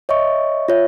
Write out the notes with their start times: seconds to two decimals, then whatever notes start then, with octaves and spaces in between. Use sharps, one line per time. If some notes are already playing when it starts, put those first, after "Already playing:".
0.09 C#5 D#5 E5 C#6
0.68 F4 C#5 E5